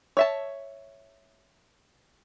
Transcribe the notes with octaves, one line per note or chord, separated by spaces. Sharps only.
C#5 E5 A5